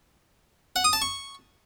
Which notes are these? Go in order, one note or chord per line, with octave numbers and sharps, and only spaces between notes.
F#5
D#6
A5
C#6